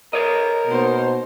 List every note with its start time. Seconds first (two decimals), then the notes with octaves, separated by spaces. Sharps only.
0.13 A#4 B4 C#5 D#5
0.67 B2 A#3 D#4 C5